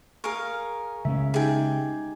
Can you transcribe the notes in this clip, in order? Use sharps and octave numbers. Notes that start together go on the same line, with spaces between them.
G#4 A#4 F5 G#5 C#6
C#3 G#3 C#4 E5
D#4 G4 G#4 G5